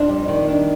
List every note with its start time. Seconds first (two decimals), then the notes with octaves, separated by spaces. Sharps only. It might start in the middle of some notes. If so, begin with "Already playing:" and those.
Already playing: F2 D4
0.09 G3
0.28 D#3
0.48 D4